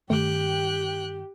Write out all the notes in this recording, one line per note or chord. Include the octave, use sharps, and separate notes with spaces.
G2 D#3 A3 G4 G5 D6 F#6